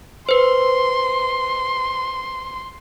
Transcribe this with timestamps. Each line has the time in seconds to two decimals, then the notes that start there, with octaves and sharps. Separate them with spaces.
0.29 B4 C5 C6